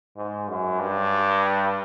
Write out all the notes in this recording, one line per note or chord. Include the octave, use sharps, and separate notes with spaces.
G#2
F#2
G2